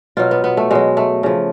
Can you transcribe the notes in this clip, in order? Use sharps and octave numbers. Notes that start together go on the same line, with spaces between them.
B2 F#3 F4
B3
B3
A3
B2 F#3 G#3
A3
C#3 F3